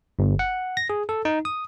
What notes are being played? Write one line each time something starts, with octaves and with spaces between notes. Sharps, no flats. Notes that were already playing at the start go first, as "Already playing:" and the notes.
G1
F#5
A#6
G#4
A4
D#4
D#6